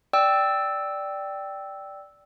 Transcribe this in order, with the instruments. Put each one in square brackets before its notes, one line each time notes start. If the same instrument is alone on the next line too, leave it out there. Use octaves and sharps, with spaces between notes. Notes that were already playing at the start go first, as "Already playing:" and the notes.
[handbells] D5 G5 E6